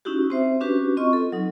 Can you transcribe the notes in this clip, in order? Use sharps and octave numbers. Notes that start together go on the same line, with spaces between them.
C#4 D#4 E4 F#4 G4
C4 C5 E5
C#4 D4 F#4 G4 B4
C4 F4 D#5 C#6
A4
F#3 D#4